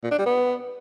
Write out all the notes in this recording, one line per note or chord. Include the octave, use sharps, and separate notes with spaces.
A#2
D4
G3
B3